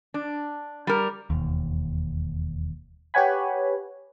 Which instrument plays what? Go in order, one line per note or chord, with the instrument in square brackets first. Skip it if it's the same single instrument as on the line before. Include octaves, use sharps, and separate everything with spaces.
[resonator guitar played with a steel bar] D4
G3 A#4
[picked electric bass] E1 D#2
[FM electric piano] G4 B4 C#5 F#5 G#5 B5